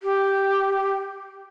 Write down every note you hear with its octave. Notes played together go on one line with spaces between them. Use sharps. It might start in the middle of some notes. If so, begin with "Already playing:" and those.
G4